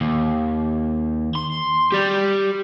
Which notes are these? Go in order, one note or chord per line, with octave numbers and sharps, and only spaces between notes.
D#2
C6
G4 D5